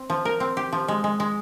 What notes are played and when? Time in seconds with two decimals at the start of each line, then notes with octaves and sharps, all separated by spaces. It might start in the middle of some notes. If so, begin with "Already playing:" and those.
Already playing: C4
0.10 F3
0.25 A#4
0.40 C4
0.57 G4
0.72 F3
0.88 G#3
1.04 G#3
1.20 G#3